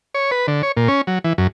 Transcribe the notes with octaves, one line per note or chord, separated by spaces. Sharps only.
C#5
B4
D3
C#5
A#2
C#4
F#3
E3
F#2